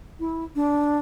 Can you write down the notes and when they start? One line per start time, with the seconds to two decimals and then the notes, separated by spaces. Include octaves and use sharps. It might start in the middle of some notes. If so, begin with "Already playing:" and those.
0.20 E4
0.56 D4